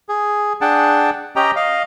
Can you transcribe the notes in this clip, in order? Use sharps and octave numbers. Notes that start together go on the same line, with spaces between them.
G#4
D4 G#4 F#5 G5 A5
C#4 G4 D#5 G5 A#5
D#5 F5